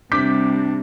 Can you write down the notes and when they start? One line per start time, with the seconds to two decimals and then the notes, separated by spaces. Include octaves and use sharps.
0.12 C3 G3 D4 D6 G6 B6